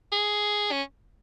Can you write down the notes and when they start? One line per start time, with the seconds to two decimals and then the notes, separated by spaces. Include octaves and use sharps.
0.12 G#4
0.72 C#4